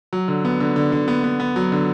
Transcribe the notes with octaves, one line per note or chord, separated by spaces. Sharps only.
F#3
D3
B3
D3
D3
D3
B3
B3
B3
F#3
D3